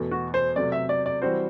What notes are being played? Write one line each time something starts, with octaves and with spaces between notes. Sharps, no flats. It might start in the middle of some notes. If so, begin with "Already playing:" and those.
Already playing: E2 B2 A3
F#4
C5
C3 F#3 A3 D5
E5
D5
D5
E3 G3 C4 F#4 C5